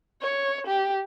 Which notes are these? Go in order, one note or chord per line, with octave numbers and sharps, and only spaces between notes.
C#5
G4